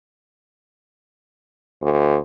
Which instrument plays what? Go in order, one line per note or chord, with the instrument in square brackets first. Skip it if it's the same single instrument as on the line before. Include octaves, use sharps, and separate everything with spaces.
[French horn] D2